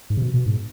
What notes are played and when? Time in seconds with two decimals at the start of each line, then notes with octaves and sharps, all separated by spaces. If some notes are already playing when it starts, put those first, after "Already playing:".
0.10 G#2
0.17 C3
0.22 B2
0.34 B2
0.46 G#2